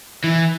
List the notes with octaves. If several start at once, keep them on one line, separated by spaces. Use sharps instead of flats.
E3